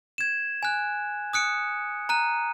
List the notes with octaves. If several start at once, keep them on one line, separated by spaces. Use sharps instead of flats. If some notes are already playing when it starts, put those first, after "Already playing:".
G#6 E7
G#5 F#6
D#6 F#6 C#7 D7
A#5 F#6 D#7